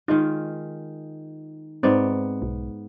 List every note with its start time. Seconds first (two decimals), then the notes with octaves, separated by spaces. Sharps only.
0.08 D#3 G#3 D#4 F4
1.83 G#2 B3 C4 D5
2.42 B1